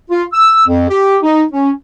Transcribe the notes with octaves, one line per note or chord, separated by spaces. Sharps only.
F4
E6
F2
G4
D#4
C#4